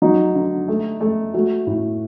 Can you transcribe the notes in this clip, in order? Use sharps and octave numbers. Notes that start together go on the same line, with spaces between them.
F#3 D#4
D3
A3
A3
A3 F#4
A2